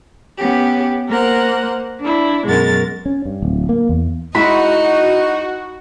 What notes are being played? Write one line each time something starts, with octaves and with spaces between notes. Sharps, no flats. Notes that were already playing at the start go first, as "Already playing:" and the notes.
B3 C#4 G4
A#3 A#4 C5 F#5
D4 E4
F#2 B2 G#3 A#4 A6
C#4
G2
D1
A#3
E2
G#3 D#4 E4 F#4 D#5 B5